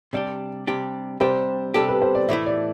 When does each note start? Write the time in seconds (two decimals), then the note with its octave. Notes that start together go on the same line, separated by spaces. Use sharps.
0.13 C3 G3 D4 G4 D5
0.67 C3 G3 D4 G4
1.20 C3 G3 D4 G4 C5
1.74 C3 G3 D4 G4 A4
1.89 B4
2.02 C5
2.15 D5
2.28 A2 E3 A3 E4 E5
2.46 D5